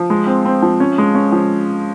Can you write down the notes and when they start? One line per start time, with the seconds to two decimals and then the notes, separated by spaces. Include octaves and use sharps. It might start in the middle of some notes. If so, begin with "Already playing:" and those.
Already playing: F3
0.10 G#3
0.27 C4
0.45 C4
0.62 F3
0.80 C#4
0.98 G#3
1.15 C#4
1.32 F3